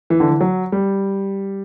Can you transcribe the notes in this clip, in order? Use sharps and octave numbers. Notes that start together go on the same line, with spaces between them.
E3
D3
E3
F#3
G3